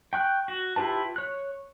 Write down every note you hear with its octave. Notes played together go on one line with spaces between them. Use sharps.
G5 C#6 F#6
F#4
E4 F4 G4 B4 A5
C#5 F#6